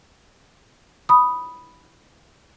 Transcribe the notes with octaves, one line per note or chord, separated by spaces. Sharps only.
B5 D#6